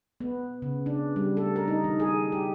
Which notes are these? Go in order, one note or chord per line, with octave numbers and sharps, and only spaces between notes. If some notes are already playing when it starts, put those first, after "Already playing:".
B3
C#3
D4
G3
A4
A#4
D#4
D#3
G#4
G4